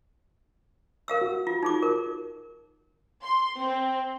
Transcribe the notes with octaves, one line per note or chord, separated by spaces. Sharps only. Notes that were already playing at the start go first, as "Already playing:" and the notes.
A#4 F5 E6
F#4
F4
D#4 G#4 D6
A#4
C6
C4